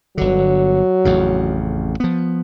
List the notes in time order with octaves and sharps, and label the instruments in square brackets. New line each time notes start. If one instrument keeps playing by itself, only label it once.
[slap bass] G1 D3 [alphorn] F#3
[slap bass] A1 F2 C#3
F3 B3